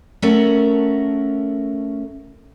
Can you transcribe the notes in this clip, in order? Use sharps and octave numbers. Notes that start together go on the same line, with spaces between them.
A3 C#4 A4 A#4 F#5